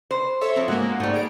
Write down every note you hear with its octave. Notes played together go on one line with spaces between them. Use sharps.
C5
A4 C#5 E5
F3 C4
G#2 G#3 A#3 F#4
G#2 G3 A3
G#4 D7